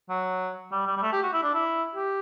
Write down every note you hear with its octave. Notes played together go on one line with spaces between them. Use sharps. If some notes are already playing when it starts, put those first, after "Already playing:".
F#3
G3
G3
G3
A3
G4
F#4
E4
D4
E4
G4